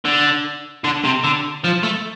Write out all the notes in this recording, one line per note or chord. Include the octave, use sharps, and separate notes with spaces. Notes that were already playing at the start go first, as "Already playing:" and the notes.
D3
D3
C3
D3
F3
A3